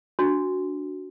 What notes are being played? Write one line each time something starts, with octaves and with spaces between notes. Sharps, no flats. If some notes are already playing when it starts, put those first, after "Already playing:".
D4 F#4